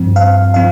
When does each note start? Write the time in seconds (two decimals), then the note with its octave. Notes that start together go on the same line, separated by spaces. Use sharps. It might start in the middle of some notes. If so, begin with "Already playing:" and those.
Already playing: G2 F3 C4
0.16 F5
0.54 F3 C4 F5